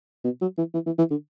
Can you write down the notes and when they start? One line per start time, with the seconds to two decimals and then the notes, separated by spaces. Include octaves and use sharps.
0.24 B2
0.42 F#3
0.58 E3
0.74 E3
0.86 E3
0.98 E3
1.11 D3